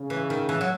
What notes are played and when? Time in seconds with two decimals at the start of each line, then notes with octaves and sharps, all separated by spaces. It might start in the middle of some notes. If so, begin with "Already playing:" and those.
Already playing: C#3
0.10 E3
0.30 D#3
0.49 E3
0.61 F#3